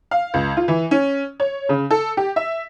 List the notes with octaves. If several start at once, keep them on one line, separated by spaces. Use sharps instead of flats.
F5
C#2
F4
E3
C#4
C#5
C#3
A4
G4
E5